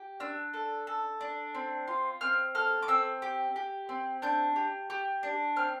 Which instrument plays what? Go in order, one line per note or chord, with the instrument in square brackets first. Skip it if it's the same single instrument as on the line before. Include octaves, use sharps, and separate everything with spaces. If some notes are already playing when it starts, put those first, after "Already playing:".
Already playing: [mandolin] G4
D4 E6
A4
A4
D4
C4
F4
C4 F6
A4 F6
D6
C4 E6
G4
G4
C4
D4 G6
G4
G4
D4
C4 F6